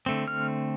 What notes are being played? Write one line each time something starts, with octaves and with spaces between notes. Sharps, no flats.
D3 A3 C4
F6